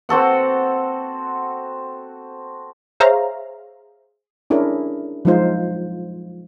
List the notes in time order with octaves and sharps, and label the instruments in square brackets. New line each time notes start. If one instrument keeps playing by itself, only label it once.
[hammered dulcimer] C4 F#4 A4 F#5
[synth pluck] G#4 C5 C#5 E5 F5 A#5
[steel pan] C#4 D4 E4 G#4 A#4 C#5
F3 F#3 G#3 D#4 F4 C5